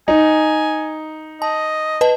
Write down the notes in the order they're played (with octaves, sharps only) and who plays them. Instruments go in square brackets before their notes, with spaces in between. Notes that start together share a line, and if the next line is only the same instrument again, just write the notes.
[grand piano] D#4 [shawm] G#5
[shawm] D#5 [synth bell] A5
[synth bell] B4 D#5 A5